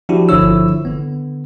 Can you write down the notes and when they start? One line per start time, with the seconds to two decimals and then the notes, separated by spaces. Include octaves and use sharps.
0.09 F3 D4 E4 F#4 G4
0.29 G1 D3 F3 E4 C#5 E6
0.85 D3 B3